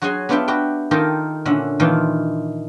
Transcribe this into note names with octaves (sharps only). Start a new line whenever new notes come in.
F#3 F#4 G#4 C#5 G#5 C6
B3 D4 F4 G4 E5 G5
F#4 G4 B4 G5
D#3 D#4 F4 G4 A4 A#4
A#2 D3 C#4 E5 F#5
A#2 D#3 E3 D4 F4